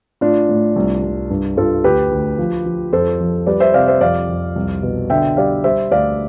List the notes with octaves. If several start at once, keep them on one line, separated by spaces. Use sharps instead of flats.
A2 D4 F4
A2
C2
C2
G2
G2 F4 A4
D2 G4 B4
D2
F3
F3
F2 A4 C5
F3
G3 B4 D5
C5 E5
C3 D5 F5
C5 E5
F2 D5 F5
F2
C2
B2
D3 E5 G5
G3 D5 F5
G3 C5 E5
D2 D5 F5